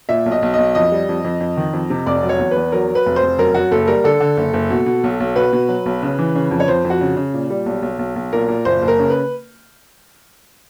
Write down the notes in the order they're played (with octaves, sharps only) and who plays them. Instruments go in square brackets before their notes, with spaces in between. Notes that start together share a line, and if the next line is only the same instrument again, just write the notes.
[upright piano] A#2 E5
B1
D#5
B1
B1 D#5
F2 D#5
G3
F2
F2
F2
D#3
F2
C3
F1 D5
F#3
C#5
E2
E2 B4
F#3 A#4
F#3
B4
F1
C5
F1
F#2 A#4
F#2 F#4
F#1 A4
G3 A#4
D3 A4
D3
F#1
F#1
B2
B2
B1
B1
B2 B4
B2
F#3
B1
C#3
E3
C#3
F2
C#5
F2 C5
F2
F#4
C#3
C#3
A#2
G3
B1
B1
B1
B1
A#2 A#4
A#2
F#1 C5
F#1
A#4
C#3
B4